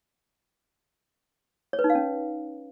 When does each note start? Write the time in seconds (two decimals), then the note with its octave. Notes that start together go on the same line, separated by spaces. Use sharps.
1.73 C#5
1.79 B4
1.84 D#4
1.90 F5
1.95 C#4